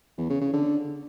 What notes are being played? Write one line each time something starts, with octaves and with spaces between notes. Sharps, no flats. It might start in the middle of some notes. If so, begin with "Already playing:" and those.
E2
C#3
C#3
D3